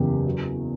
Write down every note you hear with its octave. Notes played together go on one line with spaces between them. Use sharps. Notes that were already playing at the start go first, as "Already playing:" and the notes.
Already playing: F#1 E2 G4
F#3